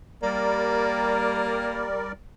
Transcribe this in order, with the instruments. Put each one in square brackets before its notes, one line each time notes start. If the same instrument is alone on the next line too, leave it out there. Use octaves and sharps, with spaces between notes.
[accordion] G3 A#4 D5 [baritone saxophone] A#3